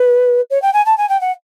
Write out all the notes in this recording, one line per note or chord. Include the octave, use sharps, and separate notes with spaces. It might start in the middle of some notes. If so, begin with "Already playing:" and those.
Already playing: B4
C#5
G5
G#5
A5
G#5
G5
F#5